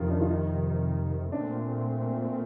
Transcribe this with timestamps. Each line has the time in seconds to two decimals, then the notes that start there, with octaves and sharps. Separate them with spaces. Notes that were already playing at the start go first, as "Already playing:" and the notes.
Already playing: F2 C3 D#3 F4
0.10 D4
0.21 F4
0.27 D#4
1.32 A#2 A3 C4 D4